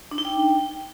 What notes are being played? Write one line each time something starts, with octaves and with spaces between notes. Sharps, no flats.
D4
D#4
G5